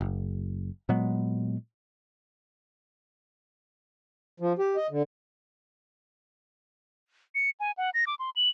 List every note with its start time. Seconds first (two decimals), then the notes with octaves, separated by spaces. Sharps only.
0.01 F#1
0.89 A#2 F#3 G#3 B3
4.40 F3
4.59 G4
4.76 D#5
4.90 D3
7.35 C#7
7.60 G#5
7.77 F#5
7.94 A#6
8.07 D6
8.19 C6
8.36 F#7